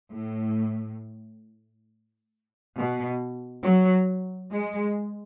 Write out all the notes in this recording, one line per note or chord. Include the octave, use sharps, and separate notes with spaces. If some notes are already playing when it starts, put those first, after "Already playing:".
A2
B2
F#3
G#3